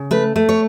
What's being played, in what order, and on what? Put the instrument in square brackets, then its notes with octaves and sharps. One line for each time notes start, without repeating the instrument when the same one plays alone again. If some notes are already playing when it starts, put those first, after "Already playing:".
Already playing: [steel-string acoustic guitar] C#3
A3 B4
A3
C#5